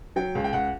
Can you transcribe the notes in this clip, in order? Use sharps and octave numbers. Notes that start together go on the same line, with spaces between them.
F#3 G5
C#2
G5
C#2 F#5